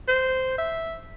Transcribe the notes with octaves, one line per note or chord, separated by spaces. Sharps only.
C5
E5